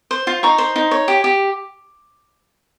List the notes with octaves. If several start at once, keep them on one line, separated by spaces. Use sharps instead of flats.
C5
F4
D#4 A#5 C#6
C5
D#4
C#5
G4
G4